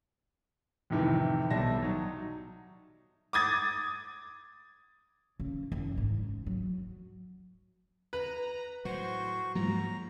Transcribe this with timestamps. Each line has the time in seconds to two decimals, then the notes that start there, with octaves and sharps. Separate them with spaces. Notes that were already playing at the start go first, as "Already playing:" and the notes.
0.90 F2 A2 C3 D#3 E3
1.50 B1 G3 E5 A5 A#6
1.82 F#3 D#4
3.33 D6 D#6 G#6 A6
5.40 C#3
5.72 F#1
5.97 G#2
6.46 F#3
8.13 B4 A#5
8.85 A2 F#3 F#4 C5 C#6
9.55 G#2 F3 F#3 G#3 A#3 A#5